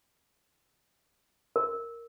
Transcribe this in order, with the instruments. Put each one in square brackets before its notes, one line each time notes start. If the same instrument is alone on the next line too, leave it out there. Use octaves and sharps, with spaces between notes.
[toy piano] A#4